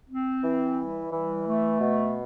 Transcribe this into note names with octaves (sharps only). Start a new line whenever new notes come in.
C4
E3
G3
E3
A3
B2